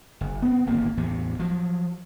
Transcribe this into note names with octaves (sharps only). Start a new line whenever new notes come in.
F#1
B3 C4
D1 G#1 C#3 A#3
A1 E2 A2 C3
F3 F#3